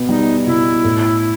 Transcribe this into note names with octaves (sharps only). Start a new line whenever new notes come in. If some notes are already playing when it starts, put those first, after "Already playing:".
Already playing: B2 B3
G3 D#4
B2 E4
A2